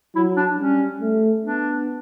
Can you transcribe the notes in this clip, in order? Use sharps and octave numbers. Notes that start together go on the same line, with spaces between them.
F#3 E4
D4
G3 C#4
A3
B3 D4